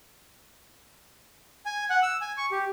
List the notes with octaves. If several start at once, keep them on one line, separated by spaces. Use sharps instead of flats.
G#5
F#5
E6
G#5
C#6
G4